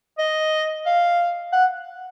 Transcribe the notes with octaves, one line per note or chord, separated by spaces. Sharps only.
D#5
F5
F#5